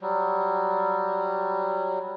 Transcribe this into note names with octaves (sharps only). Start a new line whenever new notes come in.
F#3 G3